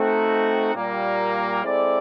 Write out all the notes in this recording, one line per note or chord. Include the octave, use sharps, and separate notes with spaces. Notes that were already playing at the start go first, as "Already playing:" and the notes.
Already playing: A3 C4 D#4 F#4
A#2 G3 A#3
G#3 C4 E4 A4 D5